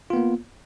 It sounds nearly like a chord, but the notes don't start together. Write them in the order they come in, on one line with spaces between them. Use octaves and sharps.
F4 B3 A#3